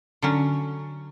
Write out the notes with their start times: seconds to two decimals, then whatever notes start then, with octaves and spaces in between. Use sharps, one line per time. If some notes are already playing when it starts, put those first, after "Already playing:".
0.22 D3 F#3 C#4